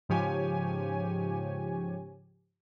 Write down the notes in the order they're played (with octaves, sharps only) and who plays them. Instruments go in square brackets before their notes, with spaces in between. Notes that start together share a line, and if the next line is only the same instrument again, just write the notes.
[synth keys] G#2 C#3 F3 G4 C#5 G#5